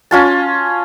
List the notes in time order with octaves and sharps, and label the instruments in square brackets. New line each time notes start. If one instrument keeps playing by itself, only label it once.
[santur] C#4 F4 A5